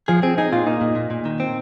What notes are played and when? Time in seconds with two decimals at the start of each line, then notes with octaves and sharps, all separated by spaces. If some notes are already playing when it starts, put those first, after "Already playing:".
0.08 F3 G#4
0.23 C4 G#4
0.38 D#4 G#4
0.53 A#2 F4
0.67 A#3 D#4
0.81 A#2
0.96 A#2
1.11 A#2
1.25 D#3
1.40 C4